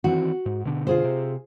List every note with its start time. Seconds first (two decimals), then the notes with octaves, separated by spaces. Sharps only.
0.04 D#3 E3 C4 F#4
0.46 G#2
0.65 B2 D3
0.87 F4 G#4 C5
1.04 C3